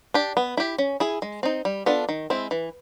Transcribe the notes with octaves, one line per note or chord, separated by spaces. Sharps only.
D4 G4
B3
E4 G4
C#4
E4 G#4
G#3
C4 D#4
G3
B3 D4 F4 A4
D#3
G#3 C4 E4
E3